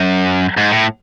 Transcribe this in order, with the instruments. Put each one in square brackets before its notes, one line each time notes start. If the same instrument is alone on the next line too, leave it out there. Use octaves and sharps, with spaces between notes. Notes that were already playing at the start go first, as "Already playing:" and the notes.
Already playing: [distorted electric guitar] F#2
G#2
A2